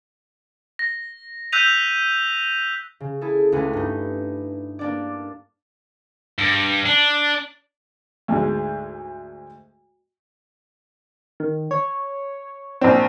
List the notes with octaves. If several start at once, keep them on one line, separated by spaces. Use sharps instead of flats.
A#6
E6 F#6 G6 B6 D#7 F7
C#3
E4 G#4 A4
C#2 C#3 A3 B4 G#5
G2 D#4
A#3 D4 D5
G2
D4
D2 G#2 G#3
D#3
C#5
A#1 C4